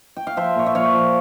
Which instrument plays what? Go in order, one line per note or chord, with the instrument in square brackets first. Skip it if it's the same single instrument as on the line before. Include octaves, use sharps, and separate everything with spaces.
[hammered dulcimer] G5
F5
F3 C5 E5
A#2 C#5
E5
F3 C#5 F5
F3